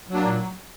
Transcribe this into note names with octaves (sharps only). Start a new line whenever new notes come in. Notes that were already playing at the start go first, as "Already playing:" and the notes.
F#3 A#3 D4
A#2